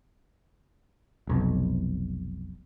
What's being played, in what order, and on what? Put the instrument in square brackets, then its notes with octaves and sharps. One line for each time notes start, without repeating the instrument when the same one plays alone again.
[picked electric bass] F1 B1